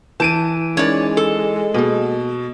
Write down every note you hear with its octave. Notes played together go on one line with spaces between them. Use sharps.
E3 A5 G6 D7 D#7
G#3 C#4 D#4 A#4 C#5 D5
A4
B2 A#3 G#4